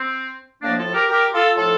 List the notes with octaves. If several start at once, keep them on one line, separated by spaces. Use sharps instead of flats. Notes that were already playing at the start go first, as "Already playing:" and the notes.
Already playing: C4
A2 F3 A#3 D4
F4 A4
G4 A#4
G4 A#4
F4 A4
A2 F3 F4 A4